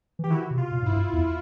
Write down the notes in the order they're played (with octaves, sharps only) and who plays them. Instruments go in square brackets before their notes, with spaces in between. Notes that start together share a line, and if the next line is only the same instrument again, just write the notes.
[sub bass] E3 [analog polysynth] G4
[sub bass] D#3 [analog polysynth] E4 F#4
[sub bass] C3
[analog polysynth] F4
[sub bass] A#2
[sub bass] G#2 [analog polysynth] E4
[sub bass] G2
E2